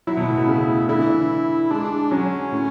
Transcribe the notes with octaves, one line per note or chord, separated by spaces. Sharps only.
F#3 E4
B2
A2
B2
C#3
D3 E4
E3
D3
G#3 D4
F#3 C#4
A2